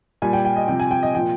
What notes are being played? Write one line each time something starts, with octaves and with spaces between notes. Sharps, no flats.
A#2 G3 G#5
G5
G5
D#5
C3 F3 G5
G#5
G5
D#5
A#2 F3 G5